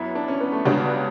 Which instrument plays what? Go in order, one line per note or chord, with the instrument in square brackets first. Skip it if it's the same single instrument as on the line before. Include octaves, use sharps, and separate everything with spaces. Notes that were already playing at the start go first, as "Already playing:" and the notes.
Already playing: [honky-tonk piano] F#2 B3 [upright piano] E4
[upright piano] D4
C#4
B3
A3
[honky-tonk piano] C#2 C#3 G3 D4 F#4 [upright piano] B3